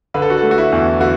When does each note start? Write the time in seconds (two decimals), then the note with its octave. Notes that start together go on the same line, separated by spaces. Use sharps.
0.14 D3 B4
0.22 A4
0.30 F#4
0.37 A4
0.43 A3
0.51 F#4
0.58 E4
0.72 E2
1.00 D3 F#4